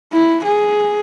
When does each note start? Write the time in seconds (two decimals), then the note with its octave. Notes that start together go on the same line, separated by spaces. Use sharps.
0.13 E4
0.44 G#4